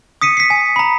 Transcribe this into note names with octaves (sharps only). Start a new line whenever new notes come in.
D#6 B6 C#7 D#7
B6 C7
G#5
A#5 B5